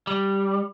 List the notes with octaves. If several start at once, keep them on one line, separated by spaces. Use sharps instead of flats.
G3